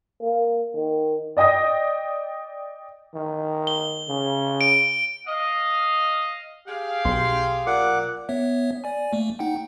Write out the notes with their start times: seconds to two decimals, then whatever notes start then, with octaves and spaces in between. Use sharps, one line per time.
0.22 A#3
0.76 D#3
1.37 D5 D#5 G5 D#6 A#6
3.15 D#3
3.67 G7
4.09 C#3
4.61 D7
5.27 D#5 F5
6.68 G4 G#4 F5
7.05 B1 C6
7.67 A#2 F#5 D6
8.29 B3 C#5 E5
8.84 D5 G#5
9.13 A3 A#3
9.39 D#4 F#5 G5